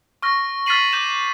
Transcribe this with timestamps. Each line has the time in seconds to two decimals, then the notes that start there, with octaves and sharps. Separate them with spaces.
0.22 C#6 F6 A#6
0.66 F6 A6 B6 C7 D#7 F#7
0.92 D6 G6 E7